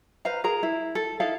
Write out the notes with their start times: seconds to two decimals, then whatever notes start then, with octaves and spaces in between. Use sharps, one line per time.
0.25 B4 C5 F5 A#5
0.44 G#4 A#4 A#5
0.63 E4
0.95 A4
1.20 D#4 E4 A4 F5